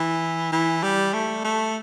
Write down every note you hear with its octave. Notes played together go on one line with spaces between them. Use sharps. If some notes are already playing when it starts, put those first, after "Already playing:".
Already playing: E3
E3
G3
A3
A3